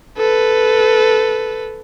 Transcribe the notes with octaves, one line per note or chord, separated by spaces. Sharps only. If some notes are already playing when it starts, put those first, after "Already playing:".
A4 B4